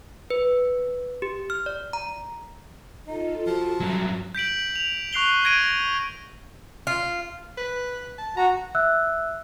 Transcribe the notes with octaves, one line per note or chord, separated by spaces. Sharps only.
B4
G4
F6
D5
A#5
D#4 F4 A4 D#5
F3 F#4
G2 F#3 E5
G6 B6 D7 F#7
F7
C#6 F#6 C7 F7 G7
G#6 A#6 D7 D#7
F4
B4
A5
F#4 A#5
E5 E6 F#6